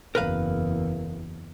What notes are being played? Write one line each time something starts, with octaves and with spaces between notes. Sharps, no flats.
F#1 E2 A#4 B4 F5